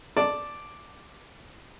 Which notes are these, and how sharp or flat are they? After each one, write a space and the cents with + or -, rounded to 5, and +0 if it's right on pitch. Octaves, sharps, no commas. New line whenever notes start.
D5 +0 A5 +0